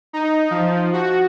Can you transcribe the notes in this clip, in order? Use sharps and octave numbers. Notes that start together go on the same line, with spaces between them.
D#4
F3
F#4